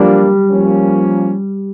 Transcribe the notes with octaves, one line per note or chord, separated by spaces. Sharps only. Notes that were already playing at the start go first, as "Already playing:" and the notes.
Already playing: F3 G3 A#3 D4
F3 A#3 C#4